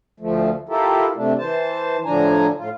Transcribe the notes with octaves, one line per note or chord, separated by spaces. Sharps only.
D2 F3 A3
E4 F4 G4 A4 A#4
C3 A3 D4
E3 C5 A5
A2 D3 F3 D4 G#5 A#5
A2 F4